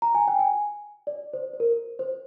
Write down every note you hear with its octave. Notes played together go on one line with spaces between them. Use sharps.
A#5
G#5
G5
G#5
D5
C5
C5
A#4
C5